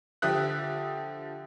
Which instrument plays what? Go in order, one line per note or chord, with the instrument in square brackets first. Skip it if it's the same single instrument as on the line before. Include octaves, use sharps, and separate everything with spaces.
[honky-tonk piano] D3 F3 G4 E5 D#6 F#6